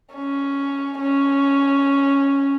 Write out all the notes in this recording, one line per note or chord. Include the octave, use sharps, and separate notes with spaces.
C#4
C#4